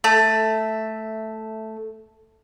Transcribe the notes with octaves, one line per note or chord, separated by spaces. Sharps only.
A3 E5